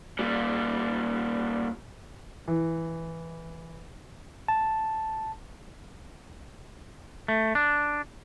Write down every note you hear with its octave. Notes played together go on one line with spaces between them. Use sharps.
A#2 G3
E3
A5
A3
D4